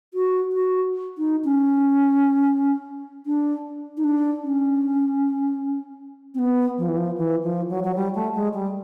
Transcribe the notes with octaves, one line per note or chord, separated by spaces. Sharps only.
F#4
F#4
D#4
C#4
D4
D#4
D4
C#4
C4
B3
F3
E3
F3
E3
F3
F#3
F#3
G3
A3
G#3
G3